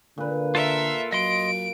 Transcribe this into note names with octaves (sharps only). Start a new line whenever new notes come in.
A#2 D3 B4
F4 A4 A#4 E5
F#3 D#5 C6 D7